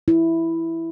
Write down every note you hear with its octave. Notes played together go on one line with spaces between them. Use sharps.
E4